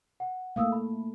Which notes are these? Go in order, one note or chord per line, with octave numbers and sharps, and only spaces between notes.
F#5
A3 A#3 F5 D#6 E6
E5 B5